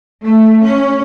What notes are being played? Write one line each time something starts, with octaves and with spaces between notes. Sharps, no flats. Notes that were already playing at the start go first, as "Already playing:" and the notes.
A3
C#4